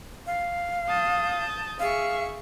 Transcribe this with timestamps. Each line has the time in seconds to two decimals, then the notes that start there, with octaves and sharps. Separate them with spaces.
0.27 F5
0.88 A5 D#6 G6
1.79 G#4 E5 F5 C#6